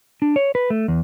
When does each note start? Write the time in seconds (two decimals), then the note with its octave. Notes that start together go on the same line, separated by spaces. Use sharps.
0.22 D4
0.36 C#5
0.55 B4
0.70 A3
0.88 E2